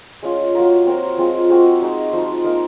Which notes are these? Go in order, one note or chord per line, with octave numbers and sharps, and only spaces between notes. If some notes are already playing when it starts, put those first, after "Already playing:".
G#3 C#4 F4
F#3 A#3 F4 A#4
C4 F#4 A#4 C#5
F3 G#3 C4 F4
G#3 C4 F#4 A#4
G#3 D#4 F#4
F3 G#3 D#4
A#3 D#4 A#4